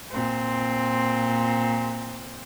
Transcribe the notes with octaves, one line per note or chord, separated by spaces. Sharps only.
A#2 C4